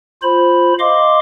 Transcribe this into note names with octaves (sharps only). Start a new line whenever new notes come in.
F4 C5 B5
D#5 F5 C6 D6